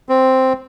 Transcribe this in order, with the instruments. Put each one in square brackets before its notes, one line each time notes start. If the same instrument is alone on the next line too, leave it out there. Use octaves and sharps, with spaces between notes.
[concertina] C4